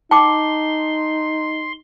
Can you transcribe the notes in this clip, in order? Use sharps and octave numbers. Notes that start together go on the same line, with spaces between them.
D#4 G5 A5 C6 D6